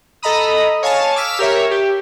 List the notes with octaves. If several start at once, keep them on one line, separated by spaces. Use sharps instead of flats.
A4 D#5 A#5 B5 D#6
C#5 F5 G#5 A5
D6 E6 F6 B6
G4 A#4 C#5 E5
G4